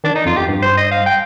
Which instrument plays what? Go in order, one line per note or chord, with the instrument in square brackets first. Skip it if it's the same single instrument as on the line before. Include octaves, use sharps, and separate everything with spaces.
[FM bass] D#3 [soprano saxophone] D4
[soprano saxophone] D#4
[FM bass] F2 [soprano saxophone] F4
[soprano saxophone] G4
[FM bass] G2
[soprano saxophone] C5
D#5
F5
G5